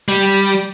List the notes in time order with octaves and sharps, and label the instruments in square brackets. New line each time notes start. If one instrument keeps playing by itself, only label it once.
[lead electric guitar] G3